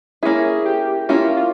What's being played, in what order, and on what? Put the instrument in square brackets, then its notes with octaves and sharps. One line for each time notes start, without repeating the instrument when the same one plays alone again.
[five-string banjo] A#3 C#4 E4 [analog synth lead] G#4
[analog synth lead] G4
[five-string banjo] A#3 C#4 E4 [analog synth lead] F4
[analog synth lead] F4